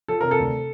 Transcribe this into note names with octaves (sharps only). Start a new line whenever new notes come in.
F3 A4
C3 A#4
A4
D2